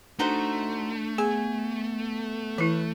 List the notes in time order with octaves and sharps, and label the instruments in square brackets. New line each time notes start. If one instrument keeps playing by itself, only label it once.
[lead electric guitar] A3 [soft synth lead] D4 [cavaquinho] D#4 F#4 C5
[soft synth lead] B3 [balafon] G#4 [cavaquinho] G#5
[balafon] E3 E4 [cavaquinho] B4